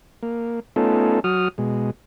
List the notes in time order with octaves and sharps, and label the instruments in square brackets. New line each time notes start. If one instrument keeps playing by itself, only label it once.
[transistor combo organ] A#3
A3 B3 C#4 D#4 F4 A4
F#3 F#4 D#6 F6
B2 G#3